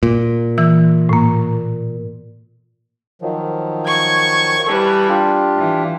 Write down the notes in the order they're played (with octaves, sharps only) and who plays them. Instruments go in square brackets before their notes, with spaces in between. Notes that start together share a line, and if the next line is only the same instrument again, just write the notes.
[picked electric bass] A#2
[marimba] E3 E6
A2 A#3
[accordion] D#3 F3 F#3
[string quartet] C#6 G#6
[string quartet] E3 G3 [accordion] A4
[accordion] D4 F4 G4
[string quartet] E3